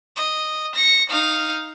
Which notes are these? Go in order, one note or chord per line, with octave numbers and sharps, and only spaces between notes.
D#5
A#6 C#7
D#4 F5